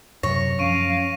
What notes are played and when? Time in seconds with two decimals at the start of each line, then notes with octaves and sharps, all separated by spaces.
0.23 F#2 C3 F#3 C#5 A#6
0.59 F#2 F3 C#4 F5 C#6 D7 D#7